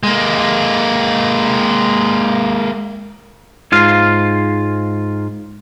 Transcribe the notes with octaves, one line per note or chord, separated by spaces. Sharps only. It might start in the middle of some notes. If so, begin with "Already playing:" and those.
G#3 A#3
G#2 F4 F5